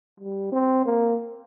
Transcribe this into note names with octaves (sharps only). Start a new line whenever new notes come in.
G3
C4
A#3